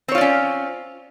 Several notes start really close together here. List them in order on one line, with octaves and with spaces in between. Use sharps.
C4 C#5 F4 D5 C#4